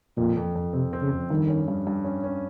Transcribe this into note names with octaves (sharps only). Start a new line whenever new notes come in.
F2 A#2
F2
F2
C3 C4
C4
C#3
F2
G2 D#3
C#4
G2
G2
C#4
C#4